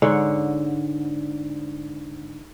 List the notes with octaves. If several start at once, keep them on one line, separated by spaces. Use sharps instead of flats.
G#2 D3 C#5 F#5